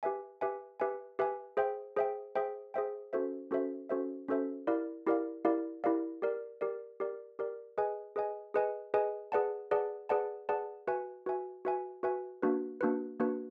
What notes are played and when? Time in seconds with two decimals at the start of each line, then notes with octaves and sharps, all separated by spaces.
0.03 G4 B4 E5 G#5
0.41 G4 B4 E5 G#5
0.80 G4 B4 E5 G#5
1.19 G4 B4 E5 G#5
1.57 G#4 C5 E5 G5
1.96 G#4 C5 E5 G5
2.35 G#4 C5 E5 G5
2.74 G#4 C5 E5 G5
3.13 C#4 F#4 A4 C5 E5
3.51 C#4 F#4 A4 C5 E5
3.89 C#4 F#4 A4 C5 E5
4.28 C#4 F#4 A4 C5 E5
4.67 E4 G4 A#4 D5 F5
5.07 E4 G4 A#4 D5 F5
5.45 E4 G4 A#4 D5 F5
5.84 E4 G4 A#4 D5 F5
6.22 G4 A#4 D5
6.61 G4 A#4 D5
7.00 G4 A#4 D5
7.39 G4 A#4 D5
7.78 G#4 B4 D#5 G#5
8.16 G#4 B4 D#5 G#5
8.54 G#4 B4 D#5 G#5
8.94 G#4 B4 D#5 G#5
9.32 G#4 B4 D5 F#5 A5
9.71 G#4 B4 D5 F#5 A5
10.09 G#4 B4 D5 F#5 A5
10.49 G#4 B4 D5 F#5 A5
10.87 F#4 B4 E5 G#5
11.26 F#4 B4 E5 G#5
11.65 F#4 B4 E5 G#5
12.03 F#4 B4 E5 G#5
12.42 A#3 D4 F#4 B4
12.81 A#3 D4 F#4 B4
13.20 A#3 D4 F#4 B4